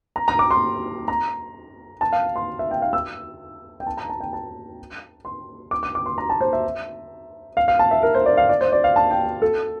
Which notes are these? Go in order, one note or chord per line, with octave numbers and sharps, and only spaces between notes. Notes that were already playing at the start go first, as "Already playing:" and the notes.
A#5
A#5
D6
C6
A#5
A5
F5
C6
E5
G5
F5
E6
G5
A5
A#5
A5
G5
A5
C6
D6
D6
D6
C6
A#5
A5
C5
E5
F5
F5
A5
E5
A#4
C5
D5
F5
D5
C5
D5
F5
A5
G5
A4